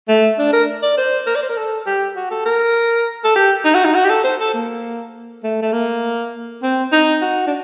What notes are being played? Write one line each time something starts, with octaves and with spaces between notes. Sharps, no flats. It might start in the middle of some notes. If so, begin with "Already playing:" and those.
A3
D4
A#4
D5
C5
A#4
D5
C5
A#4
A4
G4
F#4
A4
A#4
A4
G4
D#4
F#4
D#4
F#4
G4
A4
C5
A4
A#3
A3
A3
A#3
C4
D#4
F#4
D4